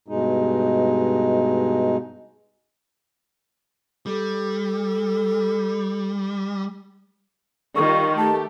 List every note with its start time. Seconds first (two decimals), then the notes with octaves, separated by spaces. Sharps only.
0.08 G2 B2 G#3 D#4
4.06 G3 A4
7.76 D#3 G3 F4 C#6
8.17 A3 G4 A5